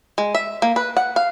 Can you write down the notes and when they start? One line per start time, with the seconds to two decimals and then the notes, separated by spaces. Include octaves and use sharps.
0.18 G#3
0.35 E5
0.62 A#3
0.76 B4
0.97 F#5
1.16 F5